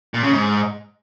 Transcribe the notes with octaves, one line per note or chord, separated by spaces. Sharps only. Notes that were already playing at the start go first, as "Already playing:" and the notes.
A#2
C#3
G#2